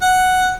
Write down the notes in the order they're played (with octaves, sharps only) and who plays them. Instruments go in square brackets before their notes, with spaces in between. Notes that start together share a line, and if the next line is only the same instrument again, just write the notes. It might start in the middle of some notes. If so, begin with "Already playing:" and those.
[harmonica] F#5